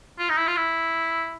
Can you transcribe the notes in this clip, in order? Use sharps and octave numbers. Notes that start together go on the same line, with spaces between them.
F4
D#4
E4
F4
E4